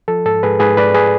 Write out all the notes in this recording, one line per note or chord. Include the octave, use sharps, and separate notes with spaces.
F3 A4
G#2 A4
G#2 G#4 B4
G#2 G#4 B4
G#2 B4 D5
G#4 B4